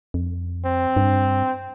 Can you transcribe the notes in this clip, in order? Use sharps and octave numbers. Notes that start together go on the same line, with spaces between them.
F2
C4
G2